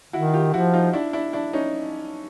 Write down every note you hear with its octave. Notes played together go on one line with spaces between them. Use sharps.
D#3 E4 F#4
F4 G4
F3 E4 F#4
D#4 F4
D4 E4
D4 E4
D4 E4
C#4 D#4